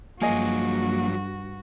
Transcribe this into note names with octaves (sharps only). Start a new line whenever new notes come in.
G2 F3 F#3 A#3 F#4 G#4 D#5